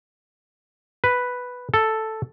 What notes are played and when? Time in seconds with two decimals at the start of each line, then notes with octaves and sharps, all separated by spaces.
1.04 B4
1.74 A4